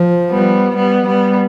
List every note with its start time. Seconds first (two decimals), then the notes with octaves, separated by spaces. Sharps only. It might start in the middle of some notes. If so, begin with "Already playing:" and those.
Already playing: F3
0.29 G3 B3
0.76 G3 B3
1.06 G3 B3